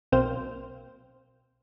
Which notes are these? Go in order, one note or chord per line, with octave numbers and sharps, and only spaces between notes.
B1 A#3 C4 C5 F6